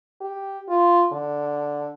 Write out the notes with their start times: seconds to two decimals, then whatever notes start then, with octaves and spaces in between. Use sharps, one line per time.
0.21 G4
0.69 F4
1.12 D3